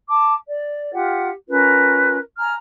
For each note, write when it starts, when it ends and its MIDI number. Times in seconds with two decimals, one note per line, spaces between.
0.09 0.34 81
0.09 0.34 86
0.47 0.89 74
0.93 1.29 65
0.93 1.29 67
0.93 1.29 78
1.48 2.18 61
1.48 2.18 65
1.48 2.18 70
1.48 2.18 71
2.38 2.52 80
2.38 2.52 82
2.38 2.52 89